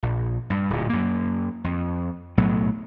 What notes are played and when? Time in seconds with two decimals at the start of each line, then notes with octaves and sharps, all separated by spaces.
0.03 A#1
0.50 G2
0.70 D1 A#2
0.89 F#2 A#3
1.64 F2
2.37 B1 A2 F#3 B3